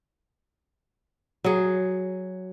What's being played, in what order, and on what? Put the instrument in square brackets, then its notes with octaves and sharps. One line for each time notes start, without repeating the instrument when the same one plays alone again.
[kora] F#3 G#4